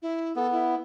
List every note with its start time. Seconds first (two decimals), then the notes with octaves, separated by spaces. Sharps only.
0.02 E4
0.36 B3 A4
0.52 E4